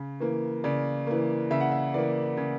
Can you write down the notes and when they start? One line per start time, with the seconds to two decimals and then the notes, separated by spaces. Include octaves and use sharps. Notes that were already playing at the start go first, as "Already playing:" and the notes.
Already playing: C#3
0.20 E3 A#3
0.64 C#3 D5
1.07 E3 A#3
1.51 C#3 E5
1.60 F#5
1.72 E5
1.94 E3 A#3 D5
2.37 C#3